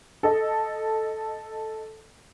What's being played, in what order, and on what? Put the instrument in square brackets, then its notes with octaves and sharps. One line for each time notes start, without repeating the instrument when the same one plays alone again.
[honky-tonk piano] A4 D#5